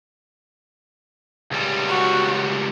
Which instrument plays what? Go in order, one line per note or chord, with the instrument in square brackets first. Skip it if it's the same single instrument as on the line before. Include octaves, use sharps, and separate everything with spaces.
[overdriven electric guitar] C#2 G3
[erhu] F#4